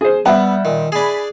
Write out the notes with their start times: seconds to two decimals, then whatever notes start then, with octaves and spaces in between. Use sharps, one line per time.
0.01 G#4 C5
0.26 G3 B3 E5 F#5
0.65 A#2 D#3 G3
0.92 D4 G#4 G#5 B5